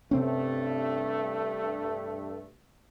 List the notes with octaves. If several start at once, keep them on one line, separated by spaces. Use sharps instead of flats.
G2 C3 A3 C4 C#4